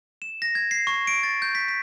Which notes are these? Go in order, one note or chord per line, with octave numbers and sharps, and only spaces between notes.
E7
A#6
G#6
C7
C#6
D7
A6
G6
B6
B6